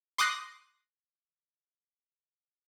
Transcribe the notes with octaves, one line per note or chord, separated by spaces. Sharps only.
C6 D6 D#6 F#6 A#6 C7